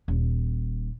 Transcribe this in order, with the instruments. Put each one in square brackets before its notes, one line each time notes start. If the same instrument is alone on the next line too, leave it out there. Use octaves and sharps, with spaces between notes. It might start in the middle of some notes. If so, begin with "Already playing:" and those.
[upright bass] D#1